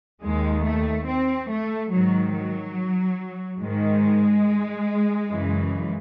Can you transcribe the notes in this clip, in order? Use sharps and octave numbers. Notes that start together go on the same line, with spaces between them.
D#2 D#3 G#3
A3
C4
A3
G#2 D#3 F#3
F#3
G#2 D#3 G#3
F#2 C#3 E3